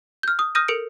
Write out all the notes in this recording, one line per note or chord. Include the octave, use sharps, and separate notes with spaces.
F6 G6
D#6
D#6 F6 G6 A#6 D#7
A4 A#4 C#7 D7